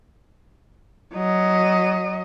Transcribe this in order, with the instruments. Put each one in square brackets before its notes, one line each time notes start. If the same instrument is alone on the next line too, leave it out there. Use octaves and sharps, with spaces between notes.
[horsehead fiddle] F#3 D#5